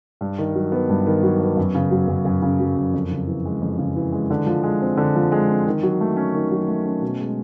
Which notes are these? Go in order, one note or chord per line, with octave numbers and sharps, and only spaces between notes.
G2
D#3
F#3
B3
G2
D#3
F#3
B3
F#2
C#3
F#3
F#2
F#2
C#3
F#3
F#2
F2
C#3
E3
G#3
F2
C#3
E3
G#3
D3
F3
G#3
C4
D3
F3
G#3
C4
D#3
F#3
A3
C#4
D#3
F#3
A3
C#4
B2
G#3